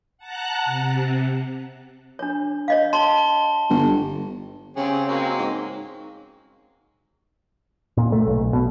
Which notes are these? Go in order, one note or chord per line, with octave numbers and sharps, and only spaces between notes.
F#5 A5 A#5 F#6
C3
D4 C#5
C#5 D#5 F5
A5 C6 G7
G1
C#3 C4 C#4 G4 G#4 F#5
F#3 G#3 A#3
G#2
A#2
A3
B1
B2